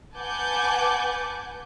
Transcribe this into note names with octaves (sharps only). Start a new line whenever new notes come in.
B4 F#5 G#5 A5 D6 G6